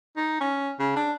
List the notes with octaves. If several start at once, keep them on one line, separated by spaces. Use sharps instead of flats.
D#4
C#4
C#3
D4